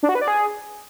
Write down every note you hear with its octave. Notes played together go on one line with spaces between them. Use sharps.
D4
F#4
B4
D5
G#4